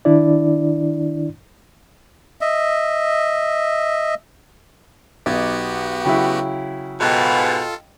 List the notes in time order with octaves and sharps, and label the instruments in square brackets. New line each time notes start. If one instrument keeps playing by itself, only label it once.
[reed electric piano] D#3 D4 E4 D5
[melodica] D#5 E5
[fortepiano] B1 D#4 [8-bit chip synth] B3 F#4 G4 [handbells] D6 G#6 A6
[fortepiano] C#3 F#3 E4 [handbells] G5 B5
[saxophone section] G#2 B2 [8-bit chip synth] F4 A4 [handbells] D#5 F5 G5